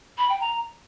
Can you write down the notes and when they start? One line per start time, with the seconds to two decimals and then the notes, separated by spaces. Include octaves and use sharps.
0.18 B5
0.29 G5
0.40 A#5